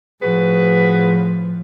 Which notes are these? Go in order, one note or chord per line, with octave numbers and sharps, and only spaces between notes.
A2 F3 F#4 G#4 B4